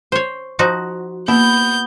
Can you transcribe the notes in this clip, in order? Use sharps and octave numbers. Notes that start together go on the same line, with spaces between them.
C5 C#5
F3 D#4 F#4
A#3 B3 E4 G6